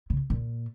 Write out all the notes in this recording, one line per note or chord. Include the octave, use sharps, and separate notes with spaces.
C#3
A#2